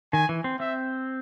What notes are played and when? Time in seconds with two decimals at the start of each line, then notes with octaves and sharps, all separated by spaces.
0.13 D#3 G#5
0.29 E3
0.44 C4
0.60 C4 E5